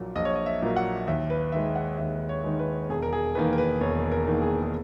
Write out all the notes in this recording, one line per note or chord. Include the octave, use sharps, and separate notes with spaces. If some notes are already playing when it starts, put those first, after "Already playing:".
Already playing: A#1 A#2 F#3 A#3
A#1 D#5
C#5
D#5
E5
A#2 F#3 A#3
F#5
D#2 E5
B4
D#3 G#3 E5
F#5
D#2 E5
C#5
D#3 G#3
B4
E1 G#4
A#4
G#4
E2 D#3 A#3 B4
A#4
B4
E1 C#5
A#4
E2 D#3 A#3
G#4
G#4